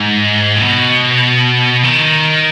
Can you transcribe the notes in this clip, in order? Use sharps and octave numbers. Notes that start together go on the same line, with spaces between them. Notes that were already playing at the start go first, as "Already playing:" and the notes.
Already playing: G#2
A2
B2
D#3